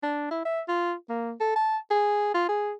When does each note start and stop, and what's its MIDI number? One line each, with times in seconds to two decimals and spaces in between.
0.03 0.28 62
0.31 0.44 64
0.45 0.61 76
0.68 0.94 65
1.09 1.32 58
1.40 1.54 69
1.56 1.77 81
1.91 2.30 68
2.34 2.44 65
2.48 2.73 68